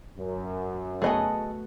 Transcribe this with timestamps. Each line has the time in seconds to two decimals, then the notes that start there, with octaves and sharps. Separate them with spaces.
0.17 F#2
1.02 A3 B3 F#4 G#4 D#5 G#5